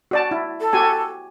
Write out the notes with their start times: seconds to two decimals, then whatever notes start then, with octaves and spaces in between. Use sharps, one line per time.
0.11 F#4 D5 A5
0.31 E4
0.60 A4
0.73 F#4 G4 G#5